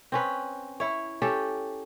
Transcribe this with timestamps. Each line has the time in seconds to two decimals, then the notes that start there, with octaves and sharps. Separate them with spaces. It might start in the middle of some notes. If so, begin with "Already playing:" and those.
0.12 C4 C#4 B4
0.80 E4 C#5
1.22 C#4 G4 A4